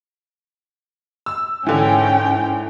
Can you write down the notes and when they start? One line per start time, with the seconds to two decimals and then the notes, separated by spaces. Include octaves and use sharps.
1.26 E6
1.67 G#2 D3 E3 C#4 G5